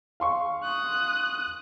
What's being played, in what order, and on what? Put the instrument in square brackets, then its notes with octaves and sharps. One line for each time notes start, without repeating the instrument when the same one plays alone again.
[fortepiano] F5 C6 C#6
[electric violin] D#6 F#6